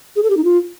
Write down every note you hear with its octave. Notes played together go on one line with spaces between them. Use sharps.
G#4
A4
G4
D#4
F4